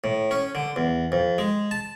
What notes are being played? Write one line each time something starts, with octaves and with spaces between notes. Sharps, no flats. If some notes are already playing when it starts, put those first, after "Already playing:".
A2
C#4
D3
E2
F2
G#3
A5